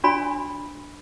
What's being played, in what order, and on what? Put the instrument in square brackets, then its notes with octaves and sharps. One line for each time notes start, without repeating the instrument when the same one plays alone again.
[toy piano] D4 F#4 C#5 G#5 B5